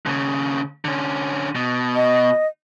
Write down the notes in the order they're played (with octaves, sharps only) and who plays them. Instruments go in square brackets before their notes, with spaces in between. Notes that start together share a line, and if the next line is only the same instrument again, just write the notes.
[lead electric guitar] D#2 C#3
D3 C#4
B2
[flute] D#5